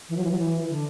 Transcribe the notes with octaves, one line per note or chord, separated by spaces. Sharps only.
E3
F#3
E3
F#3
E3
E3
D3